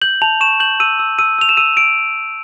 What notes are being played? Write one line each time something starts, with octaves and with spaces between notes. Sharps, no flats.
G6 F#7
A5 F7
C#6 E7
G6 F#7
E6 D#7
E6
E6 D#7
E6 F7
E7
E6 D#7
E6 D7